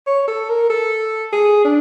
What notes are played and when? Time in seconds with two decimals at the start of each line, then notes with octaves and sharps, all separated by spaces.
0.07 C#5
0.28 A4
0.49 A#4
0.70 A4
1.32 G#4
1.65 D4